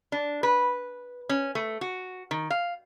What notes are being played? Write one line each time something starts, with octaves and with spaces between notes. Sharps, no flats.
D4
B4
C#4
A3
F#4
D#3
F5